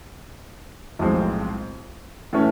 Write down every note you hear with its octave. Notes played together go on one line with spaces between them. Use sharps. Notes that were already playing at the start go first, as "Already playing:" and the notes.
B1 A2 F3 G#3 C4
A2 E3 A3 C#4